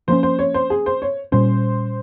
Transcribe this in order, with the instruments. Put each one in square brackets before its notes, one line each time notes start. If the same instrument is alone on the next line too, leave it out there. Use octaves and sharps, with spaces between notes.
[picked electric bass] F3 A#3 C#4 [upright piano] C5
[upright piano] C5
C#5
C5
G#4
C5
C#5
[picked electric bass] A#2 G3 C#4 [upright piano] C5